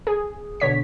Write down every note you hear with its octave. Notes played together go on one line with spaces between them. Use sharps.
G#4
B2 D3 C#5 B6